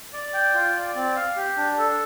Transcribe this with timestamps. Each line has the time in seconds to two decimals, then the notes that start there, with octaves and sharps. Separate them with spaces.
0.13 D5
0.34 G5
0.54 F4
0.75 D5
0.95 C4
1.16 F5
1.36 G4
1.57 D4
1.78 A4